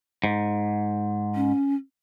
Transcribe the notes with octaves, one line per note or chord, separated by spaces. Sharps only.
G#2
C#4